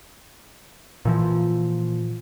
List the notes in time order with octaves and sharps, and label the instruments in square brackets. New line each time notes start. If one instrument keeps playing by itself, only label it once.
[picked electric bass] A#2 E3 F3